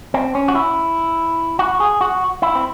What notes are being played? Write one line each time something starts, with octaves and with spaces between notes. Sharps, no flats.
C4
C#4
F#4
E4
F#4
G#4
F#4
E4
C4